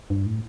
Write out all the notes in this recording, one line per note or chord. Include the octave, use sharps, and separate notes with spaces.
G2
A2